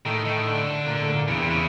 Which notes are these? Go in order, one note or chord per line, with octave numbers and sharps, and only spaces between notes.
A2 D#3
D#3
D3
A#2
A2
A#2
E2 C#3
C3
C#3